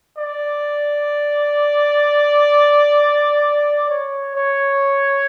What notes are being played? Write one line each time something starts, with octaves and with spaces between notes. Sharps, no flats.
D5
C#5
C#5